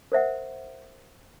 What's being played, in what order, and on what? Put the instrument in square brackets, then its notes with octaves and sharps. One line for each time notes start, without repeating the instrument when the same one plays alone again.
[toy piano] A#4 C5 E5 F#5